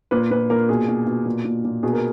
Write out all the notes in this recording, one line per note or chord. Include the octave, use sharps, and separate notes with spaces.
A#2 B4
A#2 B4
A#2 A#4
B2 G#4
B2
B2
A#2
A#2
A#2
B2 G#4
A#4